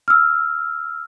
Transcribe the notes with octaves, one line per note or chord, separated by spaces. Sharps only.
E6 F6